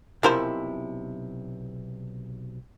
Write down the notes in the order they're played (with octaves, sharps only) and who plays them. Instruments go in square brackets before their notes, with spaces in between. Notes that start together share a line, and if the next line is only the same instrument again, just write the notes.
[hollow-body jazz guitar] B1 C3 E4 [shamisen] F3 A#4 C5